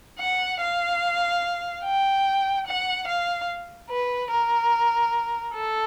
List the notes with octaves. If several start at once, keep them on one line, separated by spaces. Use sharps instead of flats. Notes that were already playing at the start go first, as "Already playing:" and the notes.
F#5
F5
G5
F#5
F5
B4
A#4
A4